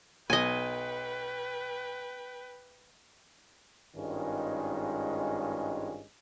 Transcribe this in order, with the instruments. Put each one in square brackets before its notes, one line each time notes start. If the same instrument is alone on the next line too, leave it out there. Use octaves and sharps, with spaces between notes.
[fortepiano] B1 [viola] B4 G5 [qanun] D#5 G#5
[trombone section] G#1 G2 D#3 G#3 C#4 F4